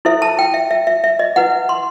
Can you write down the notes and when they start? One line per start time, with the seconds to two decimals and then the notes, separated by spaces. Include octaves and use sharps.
0.05 E4 A4 C5 E5
0.22 A5
0.39 G5
0.54 E5
0.71 E5
0.87 E5
1.04 E5
1.19 D#5
1.36 E4 B4 F#5
1.69 C6